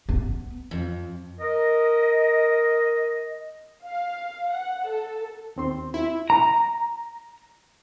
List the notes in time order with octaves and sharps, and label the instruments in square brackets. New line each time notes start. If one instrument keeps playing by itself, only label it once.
[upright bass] B3
[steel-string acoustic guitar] F2
[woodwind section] A#4 D#5
[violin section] F5
F#5
A4
[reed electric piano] D#2 C4 C6
[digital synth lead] E4
[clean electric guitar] A#5